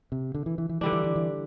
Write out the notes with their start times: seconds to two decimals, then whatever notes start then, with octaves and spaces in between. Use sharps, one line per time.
0.12 C3
0.35 D3
0.46 E3
0.58 E3
0.69 E3
0.81 D3 E3 G3 D4
0.93 E3
1.04 E3
1.16 E3